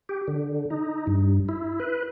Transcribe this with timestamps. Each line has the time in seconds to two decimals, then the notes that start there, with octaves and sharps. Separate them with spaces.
0.09 G4
0.28 D3
0.70 D#4
1.07 G2
1.49 E4
1.80 B4